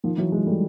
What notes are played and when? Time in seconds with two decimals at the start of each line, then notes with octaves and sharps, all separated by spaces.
0.04 D#3 F3
0.18 E3 F#3
0.32 F#3 G#3
0.46 G3 A3